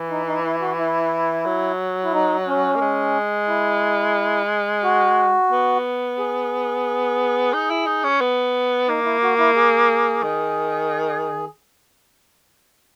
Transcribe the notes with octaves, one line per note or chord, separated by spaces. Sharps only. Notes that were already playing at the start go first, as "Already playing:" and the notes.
Already playing: E3
D#4
D#4
E4
F#4
E4
F#3
E4
D#4
C#4
A#3
G#3
E4
F#4
B3
G#4
D#4
E4
D#4
C#4
B3
A#3 D#4
E4
F#4
E4
G#4
D#3